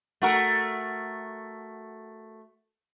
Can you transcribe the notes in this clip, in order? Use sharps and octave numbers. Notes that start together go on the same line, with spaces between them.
A3 F#4 A#4